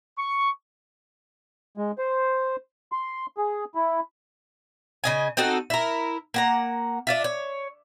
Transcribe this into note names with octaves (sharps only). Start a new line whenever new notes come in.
C#6
G#3
C5
C6
G#4
E4
C#3 D#5 G#5
C4 D#4 F#4 A4
E4 A#4
A#3 F#5 A#5
D4 F4 E5
C#5